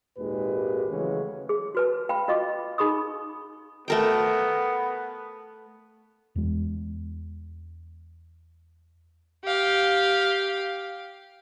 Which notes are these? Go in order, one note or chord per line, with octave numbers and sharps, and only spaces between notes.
G#1 D#2 A#2 G#3 G4 B4
C#3 E3 F#3 G#3 A3 C#4
G#4
F#4 B4 A5
F5 G5 B5
F4 F#4 D#5 F5 C#6 D6
D#4 G#4 B5 C#6 D#6
A3 B3 A#4 G5
E2 G#3
G4 F5